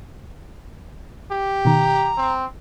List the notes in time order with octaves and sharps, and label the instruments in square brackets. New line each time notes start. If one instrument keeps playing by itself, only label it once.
[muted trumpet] G4
[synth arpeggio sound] B2 D#3 [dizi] A#5
[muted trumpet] C4